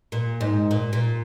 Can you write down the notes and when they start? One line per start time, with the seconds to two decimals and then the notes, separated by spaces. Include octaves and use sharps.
0.12 A#2
0.41 G#2
0.71 A#2
0.93 A#2